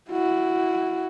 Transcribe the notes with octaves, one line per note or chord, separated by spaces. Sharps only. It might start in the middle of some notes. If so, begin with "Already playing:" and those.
E4 F#4